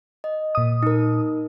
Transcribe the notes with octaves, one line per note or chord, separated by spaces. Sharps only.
D#5
A#2 D#6
D#4 A#4